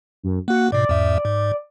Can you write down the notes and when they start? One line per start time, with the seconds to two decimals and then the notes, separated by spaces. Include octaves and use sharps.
0.23 F#2
0.48 A#3 F#4 F#5
0.72 G#2 B2 D5
0.89 E2 G#2 E5
1.25 G#2